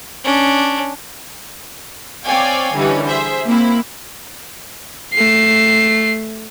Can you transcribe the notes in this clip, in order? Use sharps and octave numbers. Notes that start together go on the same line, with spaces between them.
C#4 D4
C4 C#5 D5 F5 G5 G#5
D3 E3 G3 C#4 D#4
G#4 C5 E5
A#3 C4 E4
A3 C7